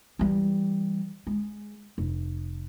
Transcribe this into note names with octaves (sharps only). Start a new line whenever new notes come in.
E3 G3
G#3
F1